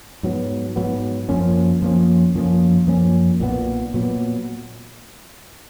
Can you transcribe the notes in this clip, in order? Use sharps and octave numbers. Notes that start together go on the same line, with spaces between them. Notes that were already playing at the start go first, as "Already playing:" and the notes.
G#2 F#3 B3
G#2 F#3 B3
F#2 F3 A#3 C#4
F#2 F3 A#3 C#4
F#2 F3 A#3 C#4
F#2 F3 A#3 C#4
B1 A#2 F#3 B3
A#2 F#3 B3